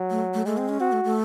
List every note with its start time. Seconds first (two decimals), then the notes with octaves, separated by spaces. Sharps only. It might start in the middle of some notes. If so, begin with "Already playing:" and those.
Already playing: F#3
0.10 A3
0.34 A3
0.46 G#3 A3
0.57 C4
0.69 C#4
0.80 C4 F#4
0.92 A3
1.04 A3